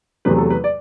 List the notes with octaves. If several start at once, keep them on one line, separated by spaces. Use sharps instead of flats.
E2 C3 F#3 A3 B4
A4
B4
D5